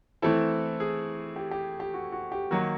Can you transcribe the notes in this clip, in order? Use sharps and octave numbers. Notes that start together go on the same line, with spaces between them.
E3 A3 C4 E4 A4
G#4
G4
G4
G4
F#4
F#4
G4
D#3 F#3 A#3 F#4